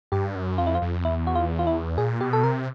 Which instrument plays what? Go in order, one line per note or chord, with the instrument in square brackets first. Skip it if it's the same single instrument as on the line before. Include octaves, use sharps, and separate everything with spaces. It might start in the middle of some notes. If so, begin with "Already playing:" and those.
[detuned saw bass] G2 [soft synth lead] G4
[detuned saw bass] F#2
[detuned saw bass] F2 [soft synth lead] F4
[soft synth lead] E4
F4
[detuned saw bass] F2
[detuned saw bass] E2 [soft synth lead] E4
[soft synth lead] F#4
F4
F4
E4
[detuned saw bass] A#2 [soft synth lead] G#4
[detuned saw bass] B2 [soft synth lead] G4
[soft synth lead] A4
[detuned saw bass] C3 [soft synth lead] A#4